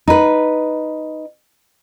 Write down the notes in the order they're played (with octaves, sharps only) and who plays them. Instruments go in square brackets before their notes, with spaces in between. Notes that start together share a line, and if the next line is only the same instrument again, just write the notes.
[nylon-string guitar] D#4 B4